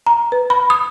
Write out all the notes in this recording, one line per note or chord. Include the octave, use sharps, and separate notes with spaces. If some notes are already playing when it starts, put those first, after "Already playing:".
A#5
B4
B5
D#6